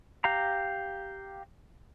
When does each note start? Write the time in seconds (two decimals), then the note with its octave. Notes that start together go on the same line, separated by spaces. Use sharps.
0.24 G4 F5 A#5